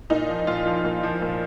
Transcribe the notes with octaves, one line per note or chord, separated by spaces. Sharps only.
A#2 D#4
F3
A#2 F4
F3
A#2
F3
A#2